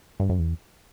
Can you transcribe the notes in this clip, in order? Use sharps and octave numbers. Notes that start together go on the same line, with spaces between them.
G2
F#2
E2